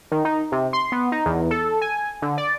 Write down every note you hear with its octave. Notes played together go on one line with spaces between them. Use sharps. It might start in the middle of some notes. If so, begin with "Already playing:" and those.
D#3
D#4
C3
C6
B3
D#4
E2
A4
G#5
D3
D5